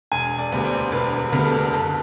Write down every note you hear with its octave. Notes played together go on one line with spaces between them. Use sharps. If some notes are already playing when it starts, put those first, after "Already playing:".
E1 G#5
D5
D2 D3 G3 B3
C5
E1 B4
D2 D3 G3 B3 A#4
A4
A#4
F#1 A4